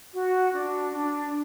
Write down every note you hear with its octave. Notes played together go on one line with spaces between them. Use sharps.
F#4
D4
D4